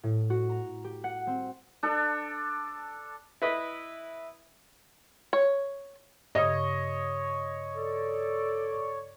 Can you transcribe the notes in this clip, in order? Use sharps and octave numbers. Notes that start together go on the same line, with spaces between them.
A2
F#4
A#5
G4
F#5
C4
D4 A4
E4 B4 D#5
C#5
G2 C#3 C#5 D#5
A4 D5